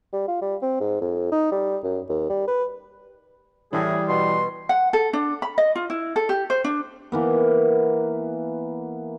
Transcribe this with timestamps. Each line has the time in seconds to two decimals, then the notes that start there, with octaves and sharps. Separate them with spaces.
0.13 G3
0.28 F4
0.42 G3
0.62 C4
0.80 G#2
1.01 F2
1.32 D#4
1.52 G3
1.84 F#2
2.09 D#2
2.29 G3
2.48 B4
3.73 A2 E3 G3 G#4
4.08 B2 C6
4.69 F#5
4.93 A4
5.13 D4
5.42 B5
5.58 D#5
5.76 F4
5.90 E4
6.16 A4
6.29 G4
6.50 C5
6.64 D4
7.12 E3 A#3 B3